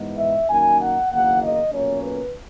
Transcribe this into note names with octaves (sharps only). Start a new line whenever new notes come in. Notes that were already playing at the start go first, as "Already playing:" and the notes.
Already playing: G#2 E3 B3 D#4
E5
F#2 D#3 A#3 D#4 G#5
F#5
F#1 E2 D#3 A#3 F#5
D#5
B1 A#2 A#3 C#4 C#5
B4